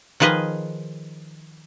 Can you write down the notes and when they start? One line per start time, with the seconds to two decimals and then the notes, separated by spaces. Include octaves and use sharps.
0.20 D#3 F3 G#4 B4 D#5